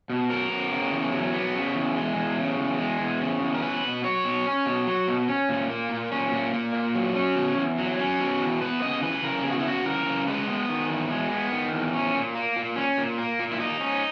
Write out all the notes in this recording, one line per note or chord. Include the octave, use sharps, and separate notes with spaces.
B2
F#3 A#4
B3
C#3
E2
F#3
B3
C#3
E2
G#3
E2
C#3
E2
G#3
E2
C#3
E2
A#4
C#4 B4
B2
F#3 C#5
B2
C#4
B2
F#3
B2
C#4
A#2
A#3
A#2
C#4
A#2
A#3
A#2
F#3
C#4
B2
E2
F#3
C#4
B2
E2
B3 B4
C#3 D#5
E3 B4
C#3 A#4
B3 G#4
F#4
E4
C#3 F#4
E3 A#4
C#3
G#3 B4
B3
D#3
E2
G#3
B3
D#3
E2
C#4
A#2
A#3
A#2
C#4
A#2
A#3
A#2
E4
A#3 D#4
C#4